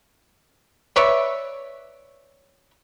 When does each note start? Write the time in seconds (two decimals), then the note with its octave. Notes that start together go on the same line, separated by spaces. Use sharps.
0.96 B4 C#5 D5 E5